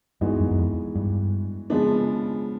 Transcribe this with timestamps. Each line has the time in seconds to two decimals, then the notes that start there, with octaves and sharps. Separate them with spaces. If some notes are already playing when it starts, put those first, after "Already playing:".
0.21 G2 E3 G#3 B3 D#4 F#4
0.40 F#2
0.51 F#2
0.58 F2
0.96 G2
1.70 C#3 F3 G#3 B3 D4